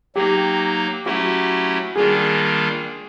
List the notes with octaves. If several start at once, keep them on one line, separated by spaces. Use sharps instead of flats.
F#3 A#3 D#4 G4
F#3 A3 C#4 E4 F#4 G4
D#3 G3 A#3 D4 F4 G#4